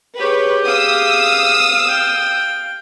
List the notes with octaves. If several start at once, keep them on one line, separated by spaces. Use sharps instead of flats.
G4 G#4 B4 C#5
F5 D#6 E6
G5